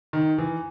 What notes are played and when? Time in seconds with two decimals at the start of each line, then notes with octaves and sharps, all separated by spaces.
0.13 D#3
0.38 E3